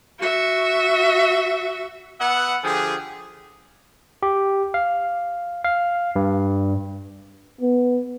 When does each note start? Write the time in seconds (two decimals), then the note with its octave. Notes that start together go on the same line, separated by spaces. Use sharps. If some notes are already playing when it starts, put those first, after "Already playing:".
0.20 F#4 E5
2.20 B3 E5 F#5
2.62 D3 F3 G4 G#4
4.23 G4
4.74 F5
5.65 F5
6.16 G2
7.61 B3